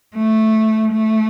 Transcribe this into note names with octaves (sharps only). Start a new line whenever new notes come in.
A3
A3